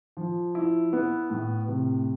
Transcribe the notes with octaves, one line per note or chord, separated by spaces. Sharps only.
F3
E4
B3
A2
C3